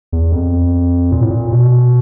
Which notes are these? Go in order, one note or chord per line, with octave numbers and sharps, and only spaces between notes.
E2
F2
A#2
A2
A#2
B2